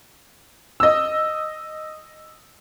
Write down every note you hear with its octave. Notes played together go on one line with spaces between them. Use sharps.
D#5 E6